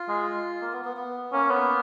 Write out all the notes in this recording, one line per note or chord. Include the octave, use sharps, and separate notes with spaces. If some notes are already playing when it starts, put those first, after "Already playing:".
Already playing: F4
G#3
A#3
B3
B3
B3
A#3 C#4
B3